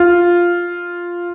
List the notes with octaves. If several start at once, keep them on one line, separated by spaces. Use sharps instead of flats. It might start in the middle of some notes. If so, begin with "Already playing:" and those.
Already playing: F4